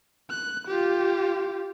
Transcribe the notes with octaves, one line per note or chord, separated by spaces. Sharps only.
F#6
F4 G4